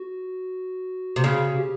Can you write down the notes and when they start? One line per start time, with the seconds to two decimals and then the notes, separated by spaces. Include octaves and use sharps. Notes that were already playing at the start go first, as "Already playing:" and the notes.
Already playing: F#4
1.16 C3
1.24 C#3 F#4
1.56 G4